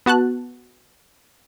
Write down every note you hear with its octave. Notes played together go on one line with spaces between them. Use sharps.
B3 F#4 A5 F#6